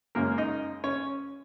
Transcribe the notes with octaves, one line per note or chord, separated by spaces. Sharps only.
F#2 C#3 G#3 A#3 C#4 A#4
D#4 D#5
C#4 C#5